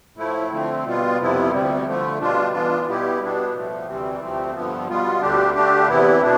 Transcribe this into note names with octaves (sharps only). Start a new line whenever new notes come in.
A2 F3 A3 E4
D3 F3 A3 C4
B2 G3 B3 F4
F2 C3 F3 B3 E4
D2 C3 G3
D3 F3 A3
B2 G3 D4 F4
E3 B3 D4 F4
B2 G3 B3 E4 G4
B2 G3 B3 D4
A2 F3 A3
D2 C3 E3 G3 C4
D2 C3 F3 A3 C4
G2 D3 F3 B3
B2 G3 B3 F4
D2 D3 G3 D4 G4
D3 A3 D4 G4
E2 C3 E3 B3 E4
B2 A3 D4